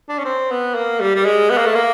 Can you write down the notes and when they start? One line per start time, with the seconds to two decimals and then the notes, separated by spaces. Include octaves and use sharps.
0.10 D4
0.19 C#4
0.25 C4
0.51 B3
0.75 A#3
1.00 G3
1.15 G3
1.26 G#3
1.50 B3
1.58 A#3
1.66 A3
1.75 A#3